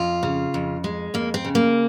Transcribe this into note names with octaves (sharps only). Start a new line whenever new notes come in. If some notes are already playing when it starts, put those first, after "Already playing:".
Already playing: F2 F4
C#3
F2
G#3
F2 A#3
C4
C#3
A#3